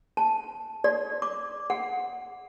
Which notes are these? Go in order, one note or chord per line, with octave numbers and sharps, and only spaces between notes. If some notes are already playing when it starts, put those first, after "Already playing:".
A5
D5
D6
F#5